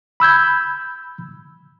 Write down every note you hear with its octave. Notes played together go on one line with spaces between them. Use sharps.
B5 E6 G6 G#6